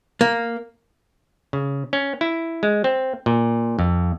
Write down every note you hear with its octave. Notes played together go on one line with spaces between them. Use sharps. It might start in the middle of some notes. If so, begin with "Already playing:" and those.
A#3
C#3
C#4
E4
G#3
C4
A#2
F2